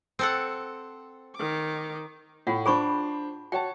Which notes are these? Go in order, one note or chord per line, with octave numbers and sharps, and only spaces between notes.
C4 A4 F#5
D#3 D6
A2 F4 F#5
D4 G#4 C5 B5 C#6
F#4 C#5 G5 A5